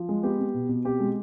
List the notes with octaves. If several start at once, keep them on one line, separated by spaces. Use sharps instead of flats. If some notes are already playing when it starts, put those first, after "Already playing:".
Already playing: F3
G#3
B3 G4
B3
B2
B2
C4 G4
G#3